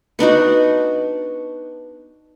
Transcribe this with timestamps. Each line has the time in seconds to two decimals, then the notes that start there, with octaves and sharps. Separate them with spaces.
0.19 B3 D4 D#4 F#4